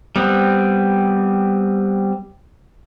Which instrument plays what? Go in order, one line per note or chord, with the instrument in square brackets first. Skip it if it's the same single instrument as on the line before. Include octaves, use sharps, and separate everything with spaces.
[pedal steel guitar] G3 B3 C4